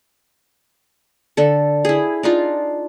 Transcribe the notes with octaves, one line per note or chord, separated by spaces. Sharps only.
D3 A4
E4 G#4
D4 D#4 F4